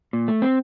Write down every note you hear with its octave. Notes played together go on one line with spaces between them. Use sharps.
A#2
A3
C4